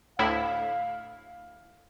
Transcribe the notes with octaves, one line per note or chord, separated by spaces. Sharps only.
D2 A2 E4 F5